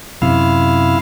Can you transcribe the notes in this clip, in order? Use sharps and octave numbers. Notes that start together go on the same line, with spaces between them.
F#2 C3 E4 F5